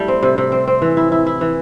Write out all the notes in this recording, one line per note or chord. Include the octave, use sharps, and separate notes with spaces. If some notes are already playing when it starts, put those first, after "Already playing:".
Already playing: G3 A3 E4
C4
C3
C3
C4
C4
E3
E4
E4
E4
E3